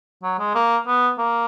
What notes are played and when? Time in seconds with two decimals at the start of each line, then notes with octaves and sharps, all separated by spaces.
0.23 F#3
0.39 G#3
0.55 A#3
0.87 B3
1.18 A#3